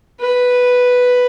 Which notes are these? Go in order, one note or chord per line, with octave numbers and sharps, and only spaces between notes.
B4